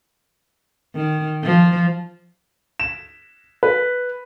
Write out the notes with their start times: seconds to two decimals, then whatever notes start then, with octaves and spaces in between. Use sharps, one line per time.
0.95 D#3
1.43 F3
2.80 E7
3.63 B4